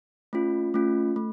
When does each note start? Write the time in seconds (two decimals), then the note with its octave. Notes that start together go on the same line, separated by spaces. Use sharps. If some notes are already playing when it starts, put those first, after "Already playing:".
0.33 A3 C#4 F4
0.74 A3 C#4 F4
1.16 A3